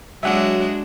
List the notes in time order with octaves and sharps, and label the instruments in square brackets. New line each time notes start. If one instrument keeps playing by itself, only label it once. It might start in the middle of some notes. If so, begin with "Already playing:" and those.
[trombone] F#3 [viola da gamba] G#3 D4 F#4 [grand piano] E5 F#5